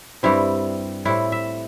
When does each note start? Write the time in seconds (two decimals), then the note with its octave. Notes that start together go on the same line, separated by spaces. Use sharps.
0.23 G2 G3 C4 E4
1.05 A2 G3 C4 E4
1.32 E5